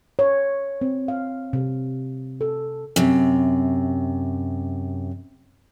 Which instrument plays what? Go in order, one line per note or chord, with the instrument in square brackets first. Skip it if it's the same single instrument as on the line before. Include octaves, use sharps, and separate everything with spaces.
[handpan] C#5
C4
F5
C3
A4
[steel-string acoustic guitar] F#2 C3